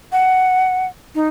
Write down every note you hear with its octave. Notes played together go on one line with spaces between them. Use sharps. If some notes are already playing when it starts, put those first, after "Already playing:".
F#5
D#4